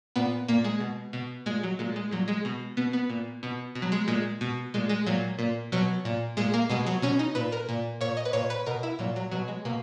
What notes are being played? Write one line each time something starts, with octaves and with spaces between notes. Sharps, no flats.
A#2 B3
A#2 A#3
G#3
B2
B2
A#2 G#3
F#3
A#2 G#3
G#3
A#2 F#3
G#3
B2
B2 B3
B3
A#2
B2
B2
F#3
G#3
A#2 G#3
B2
A#2 G#3
G#3
A#2 F#3
A#2
B2 F#3
A#2
A#2 G#3
A#3
B2 G#3
F#3
B2 C#4
D#4
A#2 B4
A#4
A#2
A#2 C#5
D#5
B4
A#2 C#5
B4
B2 A#4
E4
A#2 F#3
F#3
B2 F#3
G#3
B2 A#3